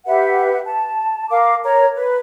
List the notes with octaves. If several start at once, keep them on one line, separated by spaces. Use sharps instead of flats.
G4 B4 E5 F#5
A5
A#4 F5 D6
A#4 C#5 A#5
B4